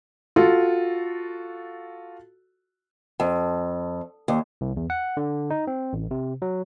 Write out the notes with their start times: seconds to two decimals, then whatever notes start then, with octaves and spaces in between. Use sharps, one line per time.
0.36 F4 F#4 A4
3.20 F2
4.28 D#2
4.61 C2
4.77 E2
4.90 F#5
5.17 D3
5.51 D#4
5.67 C4
5.93 A1
6.11 C3
6.42 F#3